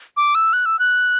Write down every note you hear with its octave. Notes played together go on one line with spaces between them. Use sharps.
D6
E6
F#6
E6
F#6